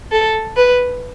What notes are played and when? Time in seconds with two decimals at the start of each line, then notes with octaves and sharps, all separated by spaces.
0.12 A4
0.57 B4